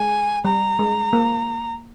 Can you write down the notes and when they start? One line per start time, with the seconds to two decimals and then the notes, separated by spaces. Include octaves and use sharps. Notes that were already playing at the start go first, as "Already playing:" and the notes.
Already playing: G#3 G#5
0.45 G3 A#5
0.79 G#3
1.13 A#3